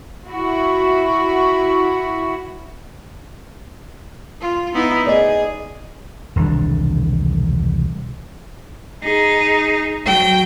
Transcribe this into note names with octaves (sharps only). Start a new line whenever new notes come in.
E4 F#4
F4
B3 D#4 E4
G#4 D5 D#5
E1 C2 D#3 D4
D#4 G#4
F#3 G5